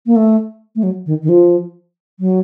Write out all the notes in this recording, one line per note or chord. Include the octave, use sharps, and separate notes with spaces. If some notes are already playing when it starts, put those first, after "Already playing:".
A#3
A3
A3
F#3
D#3
D#3
F3
F#3